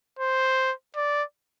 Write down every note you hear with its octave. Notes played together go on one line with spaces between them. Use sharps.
C5
D5